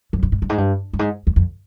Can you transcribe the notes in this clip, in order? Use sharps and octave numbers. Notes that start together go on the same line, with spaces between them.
F#2
G2
G#2
G2
G#2
G2
G2
G#2
E2
F2